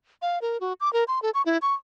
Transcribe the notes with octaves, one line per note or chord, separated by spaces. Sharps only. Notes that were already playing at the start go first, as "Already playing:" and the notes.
F5
A#4
F#4
D6
A#4
C6
A4
C#6
E4
C#6